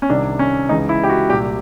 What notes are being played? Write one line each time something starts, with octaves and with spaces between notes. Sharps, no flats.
C#4
C2 C3 D#3 D4
C#4
C#2 C#3 E3 D#4
E4
G4
F#4
C2 A#2 G4